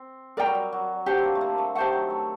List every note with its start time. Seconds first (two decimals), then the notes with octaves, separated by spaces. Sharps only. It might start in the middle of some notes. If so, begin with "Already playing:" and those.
Already playing: C4
0.37 G3 A#4 D5 G5 A#5
0.46 F#3
0.55 G3
0.72 F#3
1.06 D3 G4 C5 F#5
1.18 C4
1.24 A#3
1.35 A3
1.41 A#3
1.58 A3
1.75 A3 G4 C5 F#5
1.86 D#3
1.93 F#3
2.10 A3